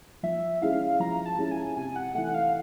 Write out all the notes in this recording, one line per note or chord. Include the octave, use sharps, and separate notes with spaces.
F3 E5
G#3 C#4 E4 F5
F3 A#5
A5
G#3 C#4 E4
G#5
C3 G#5
F#5
E3 A3 F#5
F5